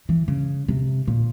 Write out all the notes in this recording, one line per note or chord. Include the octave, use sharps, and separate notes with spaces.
E3
C#3
C3
A#2